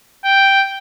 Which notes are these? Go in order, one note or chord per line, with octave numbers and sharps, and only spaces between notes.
G5